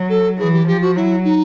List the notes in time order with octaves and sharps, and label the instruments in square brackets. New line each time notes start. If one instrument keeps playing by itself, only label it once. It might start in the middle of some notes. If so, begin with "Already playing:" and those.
Already playing: [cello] F#3
[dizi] A4
[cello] E3 [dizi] G#4
[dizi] G4
[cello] F3 [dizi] G4
[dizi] F#4
[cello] F#3 [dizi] E4
[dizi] D#4